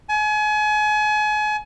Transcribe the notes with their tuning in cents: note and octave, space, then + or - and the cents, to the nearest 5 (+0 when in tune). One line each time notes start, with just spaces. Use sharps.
G#5 +35